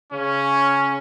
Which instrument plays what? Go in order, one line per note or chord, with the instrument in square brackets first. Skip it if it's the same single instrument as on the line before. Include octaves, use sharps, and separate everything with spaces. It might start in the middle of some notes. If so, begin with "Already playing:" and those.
[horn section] C#3 C#4